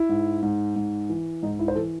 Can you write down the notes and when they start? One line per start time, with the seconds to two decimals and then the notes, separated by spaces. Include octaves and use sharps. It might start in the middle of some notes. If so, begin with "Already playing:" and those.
Already playing: E4
0.09 G#2
0.43 G#2
0.76 G#2
1.09 E3
1.43 G#2 D#4
1.59 E4
1.68 C5
1.75 E3 A4